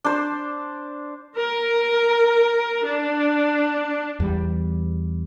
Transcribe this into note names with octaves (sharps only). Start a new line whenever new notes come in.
D4 C5
A#4
D4
E2 G3